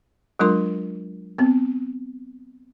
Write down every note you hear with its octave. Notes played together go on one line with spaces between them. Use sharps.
F#3 G#3 D4 F4 A#4 C6
B3 C4